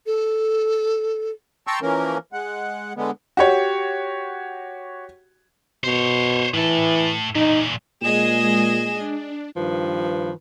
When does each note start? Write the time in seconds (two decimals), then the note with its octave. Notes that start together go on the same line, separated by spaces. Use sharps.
0.06 A4
1.67 G5 A5 A#5 C6 C#6 E6
1.82 E3 F3 A#3 C#4 A#4
2.33 G#3 F#5
2.96 D3 G#3 B3
3.37 F#4 G4 C#5
5.84 B2 C5 C#5
6.54 A2 E3 A4
7.35 A#2 E3 D#4
8.02 A#2 G#3 G#4 D#5 E7
8.92 D4
9.57 G2 D#3 F3 B4